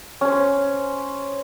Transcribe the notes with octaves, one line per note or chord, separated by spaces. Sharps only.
C#4 C5